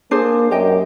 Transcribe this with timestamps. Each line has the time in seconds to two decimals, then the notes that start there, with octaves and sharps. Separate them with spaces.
0.11 A#3 D4 G#4 C5
0.51 F#2 G4 D#5 G5